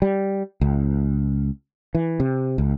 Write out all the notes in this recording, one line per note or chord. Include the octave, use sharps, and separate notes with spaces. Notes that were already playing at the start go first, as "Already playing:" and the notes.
G3
C#2
E3
C3
C#2